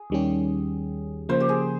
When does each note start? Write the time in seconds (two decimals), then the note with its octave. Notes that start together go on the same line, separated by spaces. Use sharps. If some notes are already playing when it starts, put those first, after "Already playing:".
Already playing: G#4
0.10 D#2 D#3 G3 C#4 G4
1.29 C#3 F3 A#3 C5
1.40 G4
1.49 G#4